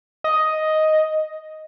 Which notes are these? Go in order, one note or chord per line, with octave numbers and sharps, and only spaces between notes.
D#5